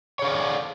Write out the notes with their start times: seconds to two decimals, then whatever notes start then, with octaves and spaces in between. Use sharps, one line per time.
0.19 C#5
0.22 G#4
0.25 F5
0.27 D5